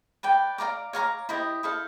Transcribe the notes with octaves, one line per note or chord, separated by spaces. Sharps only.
B4 D5 G5
D5 F5 A#5 D6
C#5 F5 A#5 D6
E4 G4 C5 D#5
E4 A4 C5 F5